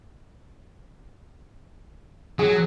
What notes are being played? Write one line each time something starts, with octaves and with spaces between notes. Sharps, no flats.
F#3 G#4